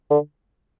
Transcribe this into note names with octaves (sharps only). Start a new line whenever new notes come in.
D3